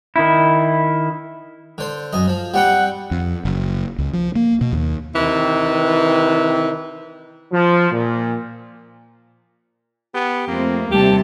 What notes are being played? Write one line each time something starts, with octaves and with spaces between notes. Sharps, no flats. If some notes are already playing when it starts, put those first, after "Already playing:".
D#3 E4
D3 C5
F#2 D#5
F3
G3 C4 F#5 G5
F2
F#1
C#2
F3
A#3
B2
D#2
C3 D#3 E3
F3
A#2
B3 G4
F2 A3 A#3 C4
D#2 C3 G3 G4 A5